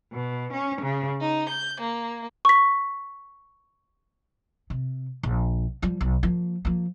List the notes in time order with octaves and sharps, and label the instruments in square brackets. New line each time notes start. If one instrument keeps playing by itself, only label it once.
[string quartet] B2
C#4
C#3
D#4
G6
A#3
[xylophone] C#6 B6
[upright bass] C3
A#1
F3 G3
B1
F3 A#3
F3 A#3